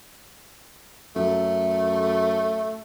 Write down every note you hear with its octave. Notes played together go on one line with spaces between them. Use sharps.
F#2 A3